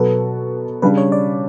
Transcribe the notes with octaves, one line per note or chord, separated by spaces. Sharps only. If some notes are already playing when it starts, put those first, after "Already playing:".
Already playing: B2 F#3 B3 F#4 A4
C#3 G3 D4 B4
C#5
D5